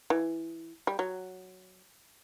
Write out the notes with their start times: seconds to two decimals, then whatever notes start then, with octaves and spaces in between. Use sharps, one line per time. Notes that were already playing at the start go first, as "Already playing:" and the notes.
0.10 E3
0.87 G3
0.99 F#3